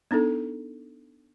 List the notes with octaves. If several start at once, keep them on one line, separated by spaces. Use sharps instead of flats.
B3 D4 D#4 A4